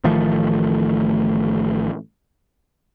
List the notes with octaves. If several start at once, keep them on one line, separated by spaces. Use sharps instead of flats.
A1 D#3 F3 A3